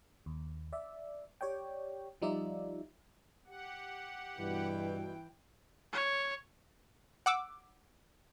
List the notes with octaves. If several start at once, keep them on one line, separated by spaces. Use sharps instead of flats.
D#2
D5 E5
G4 C#5 D5 G5
F3 G3 D#4 F4 D5 E5
G4 F#5
G2 B2 E3 G5
C#5
F#5 D6 E6